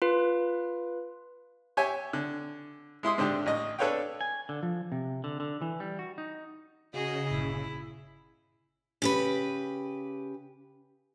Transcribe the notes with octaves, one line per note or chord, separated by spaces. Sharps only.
F4 B4
G4 C#5 E5 G#5
D3
G#3 E4 C6 D#6
G#2 D3 D4 G4
A1 D#5
D4 A4 B4 C#5 F5 G5
G#5
D3
F3
C3
D3
D3
E3
G3
F#4
D#4
C#3 F#4 G#4 D#5
G1 A#2 E4
C#3 G4 B4